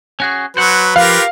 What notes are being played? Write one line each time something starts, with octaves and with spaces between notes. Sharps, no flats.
C#4 F#4 G#4
F#3 B4 C5 F#5
F3 F4 G4 A#4 F5